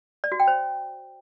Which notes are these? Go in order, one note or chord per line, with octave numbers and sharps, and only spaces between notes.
D5
F#4
G5
C5